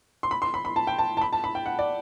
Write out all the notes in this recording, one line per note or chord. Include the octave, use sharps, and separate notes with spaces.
C6
B5
C6
B5
B5
A5
G5
A5
A5
B5
A5
B5
G5
F#5
D5